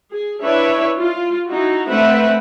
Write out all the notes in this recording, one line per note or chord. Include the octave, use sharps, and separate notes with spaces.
G#4
D4 E4 B4 C#5 E5
F4
D#4 E4 F#4
A3 C4 D4 B4 E5 F#5